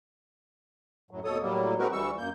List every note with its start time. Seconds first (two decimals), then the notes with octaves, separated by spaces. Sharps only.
1.11 F#2 A2 F#3
1.24 D#2 B2 A4 C#5 D#6
1.40 A2 F#3 G3 A#3
1.79 G#3 C4 D#4 F#4 A#4 B4
1.92 D2 E3 G3 C#6 E6
2.18 F#2 A#3 G6